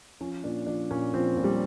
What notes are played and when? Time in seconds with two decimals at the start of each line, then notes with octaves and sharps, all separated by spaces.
0.20 F3 C#4
0.44 A#2 D4
0.66 F3 D4
0.91 A#2 C#4
1.14 F3 C4
1.37 A#2
1.44 G3